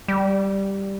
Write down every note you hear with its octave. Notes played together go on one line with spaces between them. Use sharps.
G3